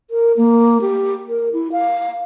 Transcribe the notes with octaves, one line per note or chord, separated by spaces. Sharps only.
A#4
A#3
G4
A#4
E4
F5